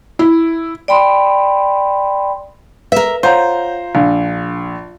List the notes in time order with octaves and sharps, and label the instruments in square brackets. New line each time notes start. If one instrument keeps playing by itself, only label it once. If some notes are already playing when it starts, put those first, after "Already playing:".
[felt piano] E4
[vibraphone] D5 G5 B5 C6
[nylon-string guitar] A#4 E5 [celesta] B4
[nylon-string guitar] F4 [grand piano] C5 A#5 [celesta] C#5 F#5 G6
[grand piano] A#1 [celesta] D4 F5